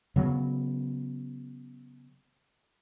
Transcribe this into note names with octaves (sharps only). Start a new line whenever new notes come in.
C#3 F#3 B3